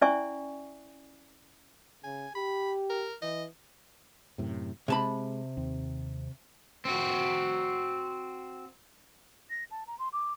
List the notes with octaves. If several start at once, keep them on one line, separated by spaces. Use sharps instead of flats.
C#4 E4 D5 E5 G#5 C#6
C#3 G#5
G4 B5
A#4
E3 D#5
F#2 A2 C3
C3 G#3 A5 B5
D#2 C4
C4 F#4
A#6
A5
A#5
C6
D6